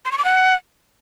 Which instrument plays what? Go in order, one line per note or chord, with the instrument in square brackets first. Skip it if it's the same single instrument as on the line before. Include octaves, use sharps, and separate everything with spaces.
[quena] C6
C#6
D6
F#5